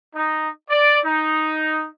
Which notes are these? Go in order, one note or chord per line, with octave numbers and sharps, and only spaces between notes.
D#4
D5
D#4